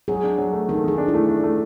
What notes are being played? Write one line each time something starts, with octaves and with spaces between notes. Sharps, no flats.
F#3 G#4
D4
F#3
A3
D#3 A4
D#3 G#4
D4
E4
A3
D4
A3